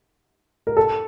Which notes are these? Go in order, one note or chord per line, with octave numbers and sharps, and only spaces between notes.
A#4
A4